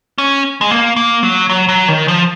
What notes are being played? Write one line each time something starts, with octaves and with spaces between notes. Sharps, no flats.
C#4
G#3
A#3
A#3
F#3
F#3
F#3
D#3
F3